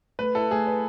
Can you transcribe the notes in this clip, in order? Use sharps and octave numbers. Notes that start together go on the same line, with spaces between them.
A3 B4
E4 A4
A3 G#4
B4